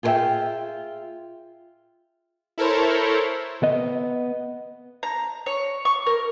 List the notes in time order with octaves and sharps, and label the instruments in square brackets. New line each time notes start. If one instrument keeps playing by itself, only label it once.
[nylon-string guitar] F4 G#4 B4 D5 E5 G5
[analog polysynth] E4 A4 A#4 C5 C#5
[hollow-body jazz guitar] B3 D#5
[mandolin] A#5
C#5
C#6
A#4